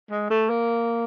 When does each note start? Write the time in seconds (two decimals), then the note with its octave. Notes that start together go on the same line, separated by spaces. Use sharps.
0.11 G#3
0.30 A3
0.50 A#3